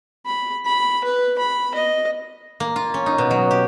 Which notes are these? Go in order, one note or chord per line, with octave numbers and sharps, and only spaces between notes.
B5
B5
B4
B5
D#5
A#3
F4
C#4
D#4
B2
F#3
G4